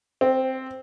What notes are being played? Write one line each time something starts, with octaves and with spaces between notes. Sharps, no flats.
C4